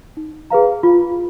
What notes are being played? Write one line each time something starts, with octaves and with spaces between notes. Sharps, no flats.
D#4
G#4 B4 F5 A#5
F4